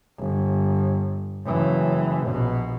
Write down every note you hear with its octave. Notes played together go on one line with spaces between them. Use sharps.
G1
F#1 E3
A#1 B2